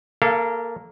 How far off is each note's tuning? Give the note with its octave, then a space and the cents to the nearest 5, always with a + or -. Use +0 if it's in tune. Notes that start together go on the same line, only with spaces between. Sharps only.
A#3 +0 A4 -5 F5 -35